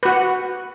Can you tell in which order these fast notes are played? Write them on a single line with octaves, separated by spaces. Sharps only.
B4 F#4 F#5